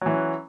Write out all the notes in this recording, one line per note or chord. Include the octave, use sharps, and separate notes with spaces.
E3 F#3 C#4